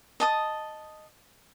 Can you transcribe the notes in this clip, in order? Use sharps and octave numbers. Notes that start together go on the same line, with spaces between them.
D#5 A5 D#6